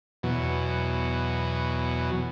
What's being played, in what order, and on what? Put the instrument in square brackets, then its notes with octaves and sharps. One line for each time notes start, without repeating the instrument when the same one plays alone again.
[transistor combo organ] E2 B2 F#3